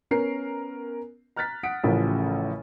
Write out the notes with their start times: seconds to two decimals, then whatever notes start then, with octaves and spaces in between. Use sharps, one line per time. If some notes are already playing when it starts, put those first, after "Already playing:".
0.11 B3 C#4 A#4 C7
1.36 A#5 F6 F#6 A6 B6
1.63 F#5 D#6 B6 D7
1.83 A1 A2 C#3 F3 A#4